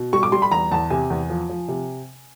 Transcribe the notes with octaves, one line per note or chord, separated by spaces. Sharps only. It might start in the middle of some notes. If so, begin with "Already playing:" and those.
Already playing: B2
G3 C#6
D6
G3 C6
B5
E2 A#5
E2 A5
C3 G#5
E2
F3
F3
C3